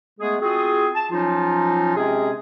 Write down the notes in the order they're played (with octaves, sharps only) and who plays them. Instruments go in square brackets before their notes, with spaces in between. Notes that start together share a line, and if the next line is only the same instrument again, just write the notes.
[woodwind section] G#3 A3 B3 G#4
C4 F4 F#4 G#4
A5
F3 F#3 C#4 D#4 F4
C3 G#3 C4 C#4 G#4